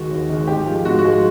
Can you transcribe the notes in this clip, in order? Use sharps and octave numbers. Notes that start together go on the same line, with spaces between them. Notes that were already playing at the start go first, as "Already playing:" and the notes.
Already playing: D#2 D#3 G#3 F#4
D#2
D#3 G#3
G#2 G4
F3 G#3
G#2 F#4
F#4
F3 G#3